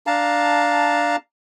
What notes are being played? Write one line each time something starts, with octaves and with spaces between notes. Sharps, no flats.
D4 F5 A5 A#5